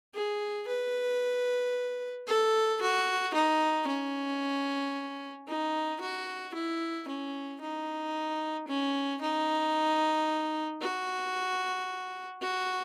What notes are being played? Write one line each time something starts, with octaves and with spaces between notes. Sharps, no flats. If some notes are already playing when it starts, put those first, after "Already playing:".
G#4
B4
A4
F#4
D#4
C#4
D#4
F#4
E4
C#4
D#4
C#4
D#4
F#4
F#4